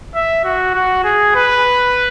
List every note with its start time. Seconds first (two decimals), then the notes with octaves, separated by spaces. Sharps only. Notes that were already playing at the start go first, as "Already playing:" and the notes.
0.15 E5
0.44 F#4
0.75 F#4
1.04 G#4
1.35 B4